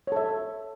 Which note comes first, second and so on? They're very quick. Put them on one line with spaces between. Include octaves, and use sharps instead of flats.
C#5 A4 E5